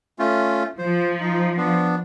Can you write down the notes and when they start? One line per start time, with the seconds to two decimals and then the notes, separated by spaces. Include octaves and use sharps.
0.19 A3 C#4 F4
0.78 F3 C5
1.19 D#4
1.57 B3 D4